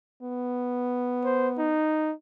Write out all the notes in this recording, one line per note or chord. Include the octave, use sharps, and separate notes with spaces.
B3
C5
D#4